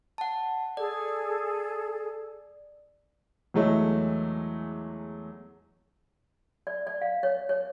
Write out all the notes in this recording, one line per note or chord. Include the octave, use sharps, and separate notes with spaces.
F#5 A5
G#4 A4 D5
E2 E3 F#3 G#3 A3
D5
D5
F5
C#5
C#5